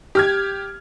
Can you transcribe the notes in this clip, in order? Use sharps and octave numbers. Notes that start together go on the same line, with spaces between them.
G4 F6 G#6